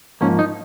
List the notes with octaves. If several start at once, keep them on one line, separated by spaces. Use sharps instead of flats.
G#2 F3 A#3 C#4
D#4